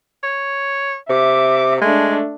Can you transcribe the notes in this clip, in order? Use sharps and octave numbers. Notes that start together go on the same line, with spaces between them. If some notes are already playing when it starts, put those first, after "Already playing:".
C#5
C3 E5 D6
G#3 A3 D4